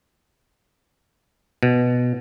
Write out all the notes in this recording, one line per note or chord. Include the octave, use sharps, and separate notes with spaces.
B2